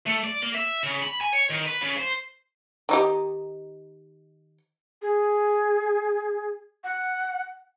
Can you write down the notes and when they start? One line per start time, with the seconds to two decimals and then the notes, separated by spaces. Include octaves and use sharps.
0.07 A3
0.24 D5
0.42 A#3
0.55 E5
0.83 C#3
1.03 B5
1.21 G#5
1.33 C#5
1.50 D#3
1.66 B4
1.81 C#3
1.96 C5
2.89 D#3 D#4 G4
5.02 G#4
6.84 F#5